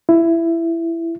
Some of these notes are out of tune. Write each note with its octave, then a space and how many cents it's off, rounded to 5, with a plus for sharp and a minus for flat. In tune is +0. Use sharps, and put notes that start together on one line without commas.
E4 +15